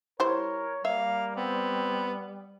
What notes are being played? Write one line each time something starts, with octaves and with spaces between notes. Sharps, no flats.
G3 E4 A#4 C5 C#5
G3 A#3 E5 F5
B3 C4